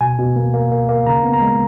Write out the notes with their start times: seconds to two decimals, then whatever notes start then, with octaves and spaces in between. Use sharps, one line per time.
0.01 B2 G#5
0.18 B2
0.36 A#3
0.53 A#3
0.71 A#3
0.89 A#3
1.07 C#3 A#5
1.24 B3
1.33 A#5
1.41 G#3